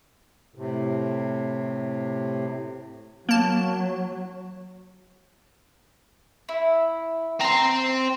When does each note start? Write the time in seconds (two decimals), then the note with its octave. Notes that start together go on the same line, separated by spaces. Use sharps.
0.55 A2 C3
3.29 F#3 A#3 A5
6.49 E4
7.41 C4 A#5 C6